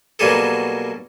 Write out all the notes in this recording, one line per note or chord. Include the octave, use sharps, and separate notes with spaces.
B2 F#3 G3 A#3 G#4 A4